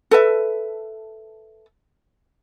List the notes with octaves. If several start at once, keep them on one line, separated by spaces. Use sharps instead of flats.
A4 B4 E5